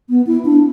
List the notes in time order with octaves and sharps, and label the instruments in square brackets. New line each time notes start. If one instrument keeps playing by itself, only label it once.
[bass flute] B3
E4
D4